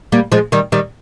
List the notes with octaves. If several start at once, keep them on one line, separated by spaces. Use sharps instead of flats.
G3 A#3
F3 G#3
D#3 G3
D#3 G3